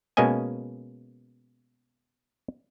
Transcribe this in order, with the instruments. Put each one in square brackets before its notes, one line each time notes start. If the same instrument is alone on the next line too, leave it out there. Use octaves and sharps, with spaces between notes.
[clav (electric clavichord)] B2 G#3 A#3 C#4 D#5 G#5